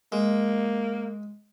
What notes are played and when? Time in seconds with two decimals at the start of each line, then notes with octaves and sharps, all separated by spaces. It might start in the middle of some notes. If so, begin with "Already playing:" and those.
0.12 G#3 A#3